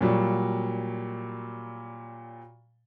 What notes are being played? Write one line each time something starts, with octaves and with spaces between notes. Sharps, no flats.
A#2 F#3 G3